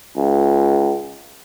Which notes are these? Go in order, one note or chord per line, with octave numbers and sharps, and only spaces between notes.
C#2